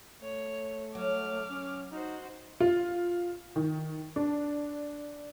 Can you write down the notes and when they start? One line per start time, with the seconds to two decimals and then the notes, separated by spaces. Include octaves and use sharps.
0.21 A3 C#5
0.95 F#3 D6 F6
1.50 C#4
1.92 D#4 F#4 C5
2.60 F4
3.56 D#3
4.16 D4